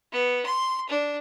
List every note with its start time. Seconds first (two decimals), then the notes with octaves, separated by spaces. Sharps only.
0.13 B3
0.46 C6
0.90 D4